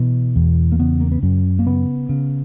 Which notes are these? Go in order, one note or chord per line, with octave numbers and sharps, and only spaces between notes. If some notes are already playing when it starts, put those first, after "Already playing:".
Already playing: B2 E3
E2
A#3
C#3 B3
A#3
B3
F#2 C#4
A#3
C#3 B3
C#3